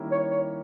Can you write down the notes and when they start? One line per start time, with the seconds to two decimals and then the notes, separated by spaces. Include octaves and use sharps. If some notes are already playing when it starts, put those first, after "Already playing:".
Already playing: D#3 G3 A#3 C#4 E4
0.11 C#5
0.31 C#5